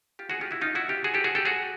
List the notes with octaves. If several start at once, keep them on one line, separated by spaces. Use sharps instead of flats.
F4 G4
F#4 G#4
F4 G4
E4 F#4
D#4 F4
E4 F#4
F4 G4
F#4 G#4
G4 A4
F#4 G#4
G4 A4
F#4 G#4